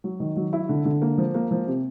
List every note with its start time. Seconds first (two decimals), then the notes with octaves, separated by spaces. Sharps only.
0.04 F#3
0.20 D#3
0.37 F#3
0.53 E4
0.69 D3
0.85 D3
1.02 A#3
1.18 F3
1.35 A#3
1.51 F3
1.67 C3